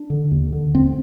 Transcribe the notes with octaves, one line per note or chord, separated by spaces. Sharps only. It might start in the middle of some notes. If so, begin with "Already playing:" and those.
Already playing: D4
D3
D#2
D3
D#2 C4